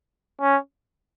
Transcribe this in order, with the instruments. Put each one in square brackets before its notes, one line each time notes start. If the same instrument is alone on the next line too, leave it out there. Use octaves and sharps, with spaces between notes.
[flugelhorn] C#4